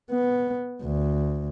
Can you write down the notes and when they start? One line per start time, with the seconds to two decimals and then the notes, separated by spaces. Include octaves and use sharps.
0.11 B3
0.83 D2